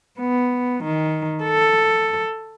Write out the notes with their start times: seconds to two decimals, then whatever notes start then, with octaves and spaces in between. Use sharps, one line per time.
0.19 B3
0.84 D#3
1.44 A4